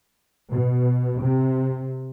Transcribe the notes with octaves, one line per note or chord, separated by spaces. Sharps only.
B2
C3